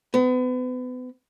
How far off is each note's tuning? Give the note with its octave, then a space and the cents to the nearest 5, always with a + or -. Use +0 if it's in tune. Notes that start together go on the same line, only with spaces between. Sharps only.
B3 +35